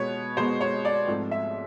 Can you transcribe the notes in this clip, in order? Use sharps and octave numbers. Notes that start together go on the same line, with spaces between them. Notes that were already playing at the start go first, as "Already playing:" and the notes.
Already playing: B2 G#3 B3 C#5
B2 G#3 B3 C5
C#5
D5
G#2 F3 A3 C4
E5